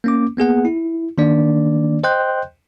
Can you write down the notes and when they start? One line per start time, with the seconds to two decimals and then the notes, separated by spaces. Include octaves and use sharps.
0.04 A#3 C#4 D6
0.37 A#3 B3 G#4 F#5
0.65 E4
1.18 D#3 A#3 D4 D5
2.04 C5 D#5 G5 C6 F#6 G6